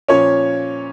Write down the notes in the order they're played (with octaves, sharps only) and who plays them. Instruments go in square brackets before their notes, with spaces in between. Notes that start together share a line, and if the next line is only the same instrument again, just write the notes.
[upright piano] A#2 F3 C#4 C#5